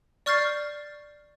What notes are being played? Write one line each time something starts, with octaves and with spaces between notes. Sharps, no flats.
D5 C#6 F6 G6 A6 C7